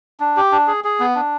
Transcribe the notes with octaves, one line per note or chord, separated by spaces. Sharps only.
D4
G4
D4
G#4
G#4
B3
D4